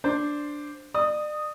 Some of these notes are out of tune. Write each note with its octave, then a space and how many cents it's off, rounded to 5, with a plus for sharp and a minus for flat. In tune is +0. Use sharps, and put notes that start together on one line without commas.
D4 +0 C5 +0
D5 +40 D#6 -5